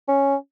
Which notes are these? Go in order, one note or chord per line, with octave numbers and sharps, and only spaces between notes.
C#4